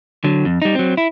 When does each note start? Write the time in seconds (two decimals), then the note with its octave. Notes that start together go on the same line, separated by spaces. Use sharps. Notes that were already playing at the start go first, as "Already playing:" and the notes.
0.24 D3 F#3
0.45 F2
0.62 G3 D#4
0.75 F#3 C4
0.97 E4